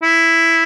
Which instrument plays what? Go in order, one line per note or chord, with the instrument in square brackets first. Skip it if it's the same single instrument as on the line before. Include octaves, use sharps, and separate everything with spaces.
[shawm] E4